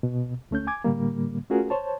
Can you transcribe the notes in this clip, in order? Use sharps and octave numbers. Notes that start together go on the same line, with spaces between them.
B2
D2 A3 C#4 G6
G#5 D6 G#6
A2 D3 G3 A#3
A3 C#4 F4 F#4 G#4 A#4
C5 C#5 A5